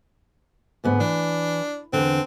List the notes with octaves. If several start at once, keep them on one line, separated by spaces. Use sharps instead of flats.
D2 G#2 B3
E3 D4
E2 D3 C4